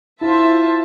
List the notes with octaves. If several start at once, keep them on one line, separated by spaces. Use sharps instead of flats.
E4 F4 C5 E5 A5